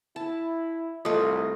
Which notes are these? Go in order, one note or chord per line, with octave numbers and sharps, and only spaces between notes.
E4 A5
C2 A3 F4 D#5